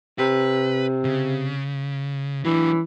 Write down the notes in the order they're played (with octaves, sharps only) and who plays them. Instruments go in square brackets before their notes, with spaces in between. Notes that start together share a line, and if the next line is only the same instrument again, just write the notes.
[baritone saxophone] C3 [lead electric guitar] B4
[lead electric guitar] C#3
[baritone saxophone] E3 [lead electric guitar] F#3 D4